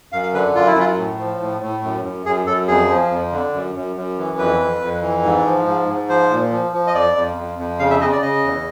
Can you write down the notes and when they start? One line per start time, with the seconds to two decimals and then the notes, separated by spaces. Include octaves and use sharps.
0.12 F#2 F5
0.23 F5
0.34 D3 B4
0.55 F#2 F4
0.67 E4
0.76 F#2 F4
0.98 A2
1.19 F3
1.40 A2
1.62 A2
1.83 F#2
2.04 F#2
2.25 F#2 G#4
2.46 F#2 A4
2.68 F2 G#4
2.89 F3
3.11 F2
3.32 D3
3.53 F#2
3.75 F#2
3.96 F#2
4.18 E3
4.38 F2 B4
4.60 F2
4.82 F2
5.02 E3
5.24 G#2
5.45 F3
5.66 G#2
5.88 G#2
6.09 F3 C5
6.30 A#2
6.52 F3
6.73 F3
6.87 D#5
6.94 F2 D5
7.16 F2
7.37 F2
7.58 F2
7.79 C#3 F5
7.90 E5
8.01 C#3 D#5
8.12 D5
8.22 C#3 D#5
8.44 E2